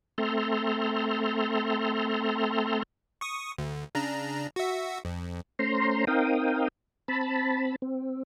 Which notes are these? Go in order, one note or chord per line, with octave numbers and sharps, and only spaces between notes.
A3 C4 A4 A#5 C6
C#6 D#6
D2
C#3 D4 A#5
F#4 E5
F2
A3 C#4 C5 A#5 C6
C4 D#4 A#4 F5 G5 D#6
C4 A5 B5
C4